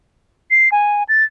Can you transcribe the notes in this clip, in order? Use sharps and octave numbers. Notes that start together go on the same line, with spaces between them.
C7
G#5
A6